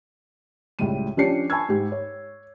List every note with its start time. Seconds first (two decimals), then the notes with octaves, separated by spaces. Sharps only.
0.79 C#2 A2 G3 D#7
1.17 F3 C#4 D4 G4 C7 C#7
1.50 G#5 A5 B5 C#6 E6 G#6
1.69 G#2 G4
1.92 C#5